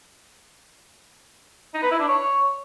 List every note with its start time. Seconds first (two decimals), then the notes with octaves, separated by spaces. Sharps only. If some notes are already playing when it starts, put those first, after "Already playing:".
1.74 D#4
1.83 B4
1.91 E4
2.00 D4
2.08 C#5